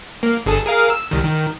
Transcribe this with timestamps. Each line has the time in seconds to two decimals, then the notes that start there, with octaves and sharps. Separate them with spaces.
0.23 A#3
0.46 G1 G#4 A4
0.66 G#4 A#4 F5
0.90 E6
1.11 C2 D#3
1.24 D#3